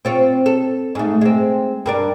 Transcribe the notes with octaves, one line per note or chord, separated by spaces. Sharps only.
C4 F4 C#5
A4
G#2 A3
G#3 C4
G2 A#4 D5